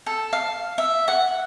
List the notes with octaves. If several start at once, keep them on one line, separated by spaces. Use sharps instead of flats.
A4
F5
E5
F#5